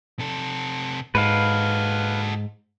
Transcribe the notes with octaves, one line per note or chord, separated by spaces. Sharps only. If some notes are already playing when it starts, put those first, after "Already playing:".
C3 A4
G#2 F#4 A4 B4 F5